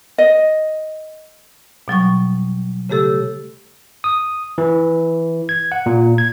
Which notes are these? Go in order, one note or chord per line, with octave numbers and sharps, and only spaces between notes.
D#5
B2 F#3 G3 C#6
C#3 A3 G4 A4 E6
D#6
E3
G#6
F#5
A#2
G#6